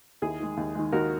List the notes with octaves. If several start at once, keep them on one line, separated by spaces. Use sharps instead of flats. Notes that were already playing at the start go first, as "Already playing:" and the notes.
D#2 E4 G#4
D#3 G#3
D#2
D#3 G#3
D#2 F#4 A#4